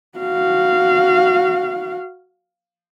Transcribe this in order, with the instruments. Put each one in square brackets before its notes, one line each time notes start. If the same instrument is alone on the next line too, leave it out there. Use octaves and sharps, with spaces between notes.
[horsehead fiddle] F#4 F5